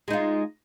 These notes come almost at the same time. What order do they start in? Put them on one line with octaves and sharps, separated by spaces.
G#3 D#4 F4